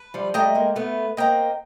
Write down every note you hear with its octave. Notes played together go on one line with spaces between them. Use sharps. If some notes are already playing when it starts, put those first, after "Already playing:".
Already playing: B4
F3 G3
G3 A3 D#5 G5 A#5
G#3 A#3
A3 B3 B4
A#3 C4 D#5 G5 A#5